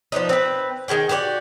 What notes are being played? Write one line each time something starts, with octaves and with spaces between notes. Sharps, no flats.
F3 B3 D4 D#4
C4 B4
D#3 F#4 G#4 G5
F#4 G4 B4 D5